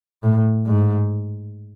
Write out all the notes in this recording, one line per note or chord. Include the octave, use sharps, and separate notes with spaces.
A2
G#2